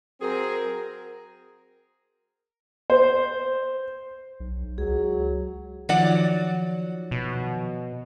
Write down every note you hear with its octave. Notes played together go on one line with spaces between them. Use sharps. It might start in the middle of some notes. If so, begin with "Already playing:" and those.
F#3 C4 G#4 A#4
C5
B1
C#2 F#3 G#4
D#3 F3 F#3 D5 F#5
B2